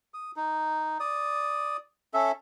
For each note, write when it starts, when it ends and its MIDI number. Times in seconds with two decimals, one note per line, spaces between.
0.14 0.32 87
0.36 0.98 63
1.00 1.77 74
1.00 1.77 87
2.14 2.32 61
2.14 2.32 69
2.14 2.32 76